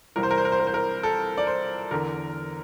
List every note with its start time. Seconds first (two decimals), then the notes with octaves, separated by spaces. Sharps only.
0.16 C2 C3 E3 A#4
0.23 C5
0.31 A#4
0.38 C5
0.45 A#4
0.52 C5
0.60 A#4
0.67 C5
0.74 A#4
1.03 A4
1.38 D5
1.47 C5
1.91 E2 D3 A#4